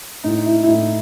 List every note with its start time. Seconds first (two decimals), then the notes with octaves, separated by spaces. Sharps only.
0.24 A2 D#4
0.45 E4
0.63 E4
0.68 A2 D#4